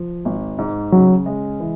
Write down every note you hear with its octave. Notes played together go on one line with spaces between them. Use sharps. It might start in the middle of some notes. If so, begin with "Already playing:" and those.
Already playing: F3
G#1
G#2
C#3 F#3
G#3
E3